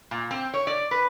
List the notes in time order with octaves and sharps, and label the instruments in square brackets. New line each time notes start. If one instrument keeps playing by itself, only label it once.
[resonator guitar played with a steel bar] A#2
C4
C#5
D5
B4